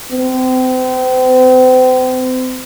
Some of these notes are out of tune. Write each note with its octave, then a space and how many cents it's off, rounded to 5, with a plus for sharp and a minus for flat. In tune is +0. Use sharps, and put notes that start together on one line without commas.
C4 -35